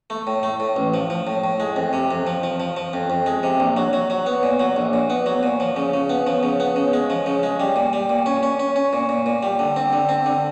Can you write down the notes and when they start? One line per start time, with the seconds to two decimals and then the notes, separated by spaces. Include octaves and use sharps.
0.10 A3
0.27 A2
0.43 A3
0.60 A2
0.76 A1
0.94 F3
1.10 F3
1.27 A2
1.44 A2
1.60 G#3
1.76 F2
1.93 C3
2.11 F2
2.27 F3
2.43 F3
2.60 F3
2.77 F3
2.93 F2
3.10 F2
3.26 G#3
3.43 C3
3.60 A#1
3.77 F#3
3.93 F#3
4.10 F#3
4.26 B3
4.43 A#2
4.60 F#3
4.76 A#1
4.93 A#2
5.10 B3
5.26 F#3
5.43 A#2
5.60 F3
5.76 C#3
5.94 C#3
6.09 B3
6.27 F3
6.43 C#3
6.60 B3
6.76 C#3
6.93 G#3
7.10 F3
7.26 C#3
7.43 G#3
7.60 G3
7.76 A#2
7.93 G3
8.10 A#2
8.26 C#4
8.43 C#4
8.60 C#4
8.76 C#4
8.93 A#2
9.09 A#2
9.26 A#2
9.43 G3
9.59 D3
9.76 C4
9.93 D3
10.09 C4
10.26 D3